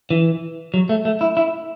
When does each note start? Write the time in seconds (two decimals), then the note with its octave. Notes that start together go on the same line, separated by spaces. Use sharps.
0.11 E3
0.74 F#3
0.89 A3
1.05 A3
1.21 E4
1.37 E4